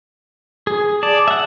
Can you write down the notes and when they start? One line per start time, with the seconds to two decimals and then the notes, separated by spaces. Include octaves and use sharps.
0.67 G#4
1.03 D5 A5
1.28 E5 F#5